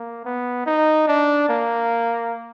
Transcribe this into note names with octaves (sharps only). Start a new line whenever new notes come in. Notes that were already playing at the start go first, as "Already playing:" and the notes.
Already playing: A#3
B3
D#4
D4
A#3